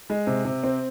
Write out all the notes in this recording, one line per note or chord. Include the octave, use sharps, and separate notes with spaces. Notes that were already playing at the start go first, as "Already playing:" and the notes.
G#3
C3
C3
C4